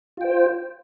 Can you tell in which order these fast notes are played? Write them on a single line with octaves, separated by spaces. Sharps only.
F4 G5 C5